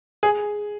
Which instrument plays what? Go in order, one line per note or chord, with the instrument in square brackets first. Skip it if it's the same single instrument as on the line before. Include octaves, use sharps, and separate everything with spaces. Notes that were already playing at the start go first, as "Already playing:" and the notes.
[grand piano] G#4